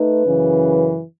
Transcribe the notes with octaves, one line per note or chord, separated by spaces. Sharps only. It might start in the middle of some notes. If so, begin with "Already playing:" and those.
Already playing: A3 D#4 B4
F#2 C#3 E3